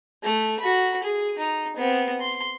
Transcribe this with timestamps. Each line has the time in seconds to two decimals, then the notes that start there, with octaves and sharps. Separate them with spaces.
0.23 A3
0.59 F#4 B5
1.03 G#4
1.38 D#4
1.76 B3 C4
2.20 C6